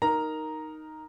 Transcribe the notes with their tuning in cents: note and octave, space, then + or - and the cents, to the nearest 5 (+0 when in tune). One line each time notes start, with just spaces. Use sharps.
D#4 +0 A#4 +0 A#5 +0